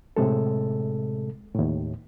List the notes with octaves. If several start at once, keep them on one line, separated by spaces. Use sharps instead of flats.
A2 C3 G#3 A4
D#2 A2